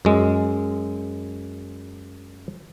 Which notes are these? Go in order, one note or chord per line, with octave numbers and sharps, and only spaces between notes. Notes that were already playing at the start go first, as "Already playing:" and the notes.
F#2 G#3